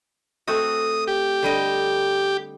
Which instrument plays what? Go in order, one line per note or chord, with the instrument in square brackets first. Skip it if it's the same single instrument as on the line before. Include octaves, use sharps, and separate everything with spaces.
[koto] A3 C4 F#4 [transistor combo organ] D#6
[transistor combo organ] G4
[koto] D3 G3 D#5